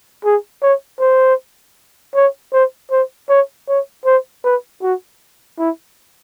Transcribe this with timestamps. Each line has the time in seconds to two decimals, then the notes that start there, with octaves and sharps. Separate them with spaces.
0.24 G#4
0.62 C#5
1.00 C5
2.15 C#5
2.53 C5
2.91 C5
3.29 C#5
3.68 C#5
4.05 C5
4.44 B4
4.82 F#4
5.58 E4